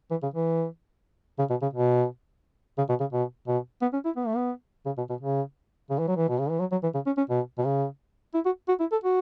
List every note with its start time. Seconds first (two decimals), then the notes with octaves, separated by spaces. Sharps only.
0.11 E3
0.23 C#3
0.34 E3
1.39 C#3
1.50 B2
1.62 C#3
1.73 B2
2.78 C#3
2.89 B2
3.00 C#3
3.13 B2
3.47 B2
3.82 B3
3.93 C#4
4.05 E4
4.16 B3
4.27 A3
4.36 B3
4.86 C#3
4.98 B2
5.10 B2
5.21 C#3
5.90 C#3
5.99 E3
6.08 F#3
6.17 E3
6.29 B2
6.39 C#3
6.49 E3
6.60 F#3
6.72 F#3
6.83 E3
6.94 C#3
7.06 C#4
7.18 C#4
7.30 B2
7.58 B2
7.65 C#3
8.34 E4
8.45 F#4
8.68 F#4
8.80 E4
8.92 A4
9.04 F#4